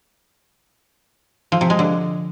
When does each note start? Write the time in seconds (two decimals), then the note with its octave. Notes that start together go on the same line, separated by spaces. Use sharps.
1.52 F3
1.61 C3
1.70 G#3
1.79 D3